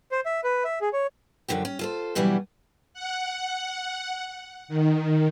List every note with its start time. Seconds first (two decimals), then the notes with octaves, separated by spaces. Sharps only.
0.12 C5
0.26 E5
0.44 B4
0.64 E5
0.81 G#4
0.93 C#5
1.48 F#2 A2 D3 F3 G4
1.65 C#4
1.79 F4 A4 C5
2.15 B2 E3 F#3 G3 B3 D4
2.94 F#5
4.68 D#3